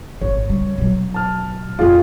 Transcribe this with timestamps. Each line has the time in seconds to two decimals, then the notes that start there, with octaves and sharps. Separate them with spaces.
0.21 G#1 C#5
0.49 C#3 G3
0.78 B2 F#3
1.14 A5 F6
1.79 F2 B3 F4 G#4